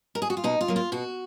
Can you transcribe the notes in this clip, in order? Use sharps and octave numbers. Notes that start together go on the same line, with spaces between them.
A#4
G#4
F#4
F4
B2 D#4
F4
F#3 A#3
F4
B2 F#4